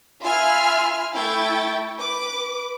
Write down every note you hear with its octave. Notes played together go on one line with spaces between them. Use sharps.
F4 E5 G#5 B5 F6 C7
A3 E4 G5 C#6 A6
B4 D6